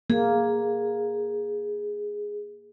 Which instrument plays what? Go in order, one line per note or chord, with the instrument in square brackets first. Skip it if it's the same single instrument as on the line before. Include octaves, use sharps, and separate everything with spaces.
[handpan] A#3 [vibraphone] G#4